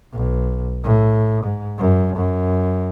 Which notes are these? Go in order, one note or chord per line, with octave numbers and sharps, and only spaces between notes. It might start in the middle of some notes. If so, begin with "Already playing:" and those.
B1
A2
G#2
F#2
F#2